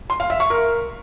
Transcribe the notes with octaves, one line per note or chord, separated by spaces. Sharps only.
C6
F5
E5
C#6
A#4